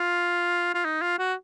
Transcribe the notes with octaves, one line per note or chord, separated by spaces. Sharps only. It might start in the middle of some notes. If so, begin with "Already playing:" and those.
Already playing: F4
F4
D#4
F4
F#4